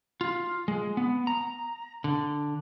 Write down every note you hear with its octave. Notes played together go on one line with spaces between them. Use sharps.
F4
G#3
B3
A#5
D3